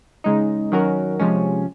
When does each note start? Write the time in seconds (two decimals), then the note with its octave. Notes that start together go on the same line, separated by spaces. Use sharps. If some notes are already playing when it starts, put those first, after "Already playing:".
0.24 C#3 G#3 D#4
0.72 D#3 F#3 C#4 F#4 A#4
1.19 C3 F3 G#3 C#4